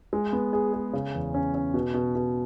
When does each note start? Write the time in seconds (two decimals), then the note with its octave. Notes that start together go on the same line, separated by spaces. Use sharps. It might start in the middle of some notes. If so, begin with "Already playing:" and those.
0.13 G#3
0.33 B3
0.53 G#4
0.73 G#4
0.93 C#3
1.14 E2
1.34 C#4
1.54 C#4
1.74 B2
1.94 B2
2.15 B2